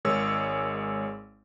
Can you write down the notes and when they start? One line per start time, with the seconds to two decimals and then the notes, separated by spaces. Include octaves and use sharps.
0.05 G#1 G#3 G#4 A#4 C#5 E6